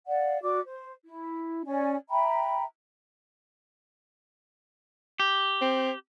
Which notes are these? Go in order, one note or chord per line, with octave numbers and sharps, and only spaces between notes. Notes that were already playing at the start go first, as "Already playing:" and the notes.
D5 F5 F#5
F#4 D5 D6
C5
E4
C#4 D5 G#5
E5 G5 A#5 B5
G4
C4